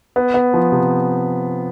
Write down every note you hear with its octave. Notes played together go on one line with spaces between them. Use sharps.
B3
B3
F3
C3